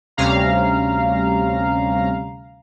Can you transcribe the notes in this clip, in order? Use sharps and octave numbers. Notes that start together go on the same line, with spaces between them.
D2 C3 G3 C#4 F5 A#5